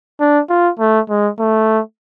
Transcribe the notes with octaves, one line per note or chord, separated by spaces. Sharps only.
D4
F4
A3
G#3
A3